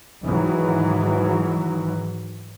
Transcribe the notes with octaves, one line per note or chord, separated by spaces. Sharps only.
G#2 D#3 E3 F#3